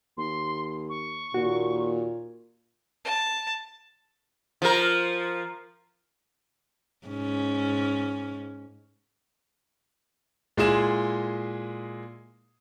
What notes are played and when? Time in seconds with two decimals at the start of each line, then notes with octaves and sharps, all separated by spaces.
0.17 D#2 C6
0.89 C#6
1.34 D#2 A#2 F#4
3.05 A5
4.62 F3 A#4
7.06 G#2 C#4
10.57 A#2 G#3 E4 G#4 E7